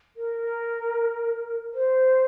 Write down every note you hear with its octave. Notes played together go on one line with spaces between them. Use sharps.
A#4
C5